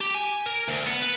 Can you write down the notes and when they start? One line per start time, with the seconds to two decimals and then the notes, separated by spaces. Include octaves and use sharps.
0.01 G4
0.15 G#5
0.46 A#4
0.68 D2
0.87 B3
1.02 B4